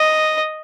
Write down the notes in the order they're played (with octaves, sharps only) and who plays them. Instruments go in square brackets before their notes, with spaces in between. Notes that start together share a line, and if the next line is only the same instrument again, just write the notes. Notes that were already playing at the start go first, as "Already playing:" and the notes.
Already playing: [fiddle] D#5